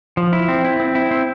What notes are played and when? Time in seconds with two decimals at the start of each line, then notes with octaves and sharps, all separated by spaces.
0.17 F3
0.33 E4
0.48 C4
0.65 E4
0.80 C4
0.95 E4
1.11 C4